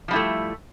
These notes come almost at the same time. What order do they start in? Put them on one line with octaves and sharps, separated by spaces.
F3 G3 E4 A3